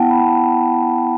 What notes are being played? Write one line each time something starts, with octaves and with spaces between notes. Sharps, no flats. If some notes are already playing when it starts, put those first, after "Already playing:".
Already playing: B3 E4 F#5 G5 A5
B5
B3 A5